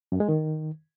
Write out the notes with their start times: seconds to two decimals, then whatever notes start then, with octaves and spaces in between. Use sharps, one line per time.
0.12 F#2
0.20 G#3
0.29 D#3